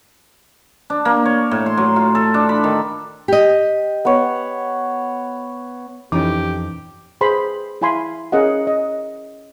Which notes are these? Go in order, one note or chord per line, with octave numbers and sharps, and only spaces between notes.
D4
A#3
C#5
A2
C6
F#3
F4
A4
D4
B5
D#3
G4 D#5
B3 C#5
F2 E3 C#4 D#4 G4 D6
G#4 B4 C5 B5 C6
E4 F5 G#5 B5 C6
C#4 G#4 A#4 D#5 F5 F#5
D#5